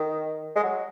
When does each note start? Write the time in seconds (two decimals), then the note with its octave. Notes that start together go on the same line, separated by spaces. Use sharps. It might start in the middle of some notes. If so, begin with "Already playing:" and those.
Already playing: D#3
0.56 G#3
0.63 F#3